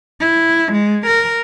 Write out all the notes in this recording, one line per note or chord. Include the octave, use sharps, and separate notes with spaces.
E4
G#3
A#4